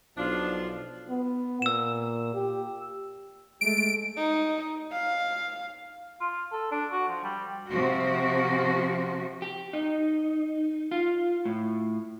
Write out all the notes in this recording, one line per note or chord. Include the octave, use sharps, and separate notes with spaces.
B1 F3 D4 F4
B3
A#2 E6 E7
G4
G#3 A3 D7
D#4
F5
F4
A4
D4
F#4
F3
G3
C3 F3 F#4
G4
D#4
F4
A2